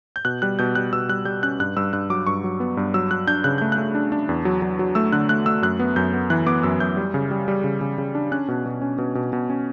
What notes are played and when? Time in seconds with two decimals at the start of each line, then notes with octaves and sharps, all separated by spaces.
0.16 G6
0.25 B2 F#6
0.42 G3 F#6
0.59 B2 G6
0.75 G3 F#6
0.93 B2 E6
1.09 G3 F#6
1.25 G3 G6
1.43 C#4 F#6
1.60 G2 F#6
1.76 G2 E6
1.93 G2 F#6
2.10 F#3 D6
2.27 G2 C#6
2.44 F#3
2.60 B3
2.77 G2
2.94 F#3 E6
3.11 F#3 F#6
3.27 D4 G6
3.44 C#3 F#6
3.58 A3 G6
3.72 F#6
3.78 A3
3.95 D4
4.12 D4
4.29 E2
4.45 F#3
4.62 F#3
4.79 F#3
4.95 A3 E6
5.12 D3 F#6
5.29 A3 F#6
5.46 A3 E6
5.62 F#2 F#6
5.79 B3
5.96 F#2 G6
6.13 B3
6.30 E3 F#6
6.46 B3 D6
6.63 F#2 E6
6.80 F#2 G6
6.97 G3
7.14 C#3
7.31 G3
7.48 G3
7.64 C#3
7.81 C#3
7.98 C#3
8.15 D4
8.32 C#4 F#6
8.48 B2
8.66 B2
8.81 C#4
8.98 B2
9.15 B2
9.33 B2
9.50 C#4